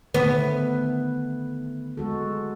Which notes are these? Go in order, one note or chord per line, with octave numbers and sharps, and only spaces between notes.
D3 D#3 A3 B3
B4
G#3 F#4 A4